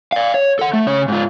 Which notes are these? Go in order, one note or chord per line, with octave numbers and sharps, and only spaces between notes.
D5 F5
C#5
A4 F#5
A3
C#3 C#5
G#2 F4